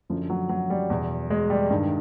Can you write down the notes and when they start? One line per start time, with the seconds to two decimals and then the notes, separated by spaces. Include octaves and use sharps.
0.09 F#2 D3 F3
0.30 F#3
0.49 F#3
0.70 G3
0.90 E2 B2
1.30 G#3
1.50 G3
1.70 G2 D#3